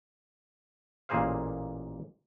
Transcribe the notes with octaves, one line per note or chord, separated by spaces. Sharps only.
A1 A#2 A#3 G#4 C5 F5